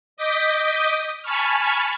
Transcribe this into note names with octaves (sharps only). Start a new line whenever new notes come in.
D#5 D6 D#6 G6 B6
G#5 A5 B5 C#6 F6